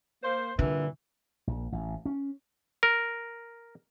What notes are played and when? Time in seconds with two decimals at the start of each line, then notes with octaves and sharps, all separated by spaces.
0.23 A#3 C5
0.59 G2 A#2 D3 E3
1.47 A#1
1.72 A1
2.05 C#4
2.83 A#4